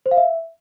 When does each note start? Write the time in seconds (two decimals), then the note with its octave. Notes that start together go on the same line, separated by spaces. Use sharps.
0.06 C5
0.11 F5
0.17 E5